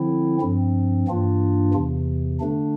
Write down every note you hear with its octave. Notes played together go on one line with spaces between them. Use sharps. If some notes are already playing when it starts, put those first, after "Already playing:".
Already playing: D3 F3 C4 E4
G2 F3 C4
G2 E3 A#3 D4 F4
E2 C3 E3
D3 A3 D4